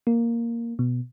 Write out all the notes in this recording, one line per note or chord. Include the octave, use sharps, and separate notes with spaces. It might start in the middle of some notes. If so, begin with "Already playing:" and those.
A#3
B2